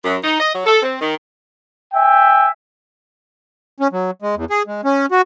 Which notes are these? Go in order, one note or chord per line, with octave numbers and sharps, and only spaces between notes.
F#2
D#4
D#5
F#3
A4
C4
D#3
E5 G5 G#5
C#4
F#3
G#3
E2
G#4
G#3
C#4
F#4